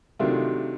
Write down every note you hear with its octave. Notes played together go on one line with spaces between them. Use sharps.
C3 D#3 F#3 A3 D4 F4